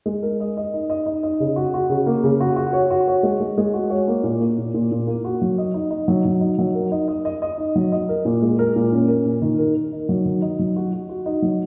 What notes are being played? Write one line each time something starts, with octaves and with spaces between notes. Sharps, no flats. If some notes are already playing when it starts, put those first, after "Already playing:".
G#3
A#4
D#5
D#5
D#4
D#5
D#4
D#5
C#3
F#4
F#4
C#3
A#3
C#3
F#4
F#4
C#5
F#4
C#5
G#3
G#3
G#3
F#4
C#5
A#3
A#2
A#3
A#2
A#2
A#2
A#3
F#4
F#3
D#5
D#4
D#4
F#3
F#3
D#4
F#3
A#4
D#4
D#5
D#5
D#5
D#4
F#3
D#5
A#4
A#2
G#3
A#4
A#2
C#4
A#4
A#2
D#3
A#4
A#4
D#4
F#3
D#3
D#4
F#3
F#4
F#4
F#4
D#4
F#3